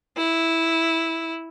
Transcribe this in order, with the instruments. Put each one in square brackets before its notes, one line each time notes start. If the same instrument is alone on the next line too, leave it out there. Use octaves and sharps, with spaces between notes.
[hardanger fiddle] E4